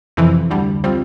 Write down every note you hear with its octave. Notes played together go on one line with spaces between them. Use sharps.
F2 C3 E3
D2 D3 G3
C3 G3 C4 F4